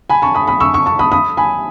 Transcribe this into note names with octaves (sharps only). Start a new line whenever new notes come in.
G#5 B5
A5 C#6
B5 D#6
B5 D#6
C#6 E6
C#6 E6
A5 C#6
B5 D#6
B5 D#6
G#5 B5